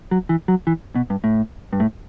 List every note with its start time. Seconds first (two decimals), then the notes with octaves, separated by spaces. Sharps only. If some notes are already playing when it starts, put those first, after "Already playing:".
0.11 F#3
0.29 E3
0.48 F#3
0.67 E3
0.95 B2
1.10 G2
1.24 A2
1.73 G2
1.80 A2